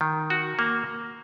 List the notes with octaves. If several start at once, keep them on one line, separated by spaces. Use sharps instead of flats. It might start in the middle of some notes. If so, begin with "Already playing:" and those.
D#3
F#4
A#3